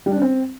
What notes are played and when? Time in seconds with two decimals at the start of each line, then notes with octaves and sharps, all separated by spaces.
0.06 G3
0.11 D4
0.16 C#4
0.22 C4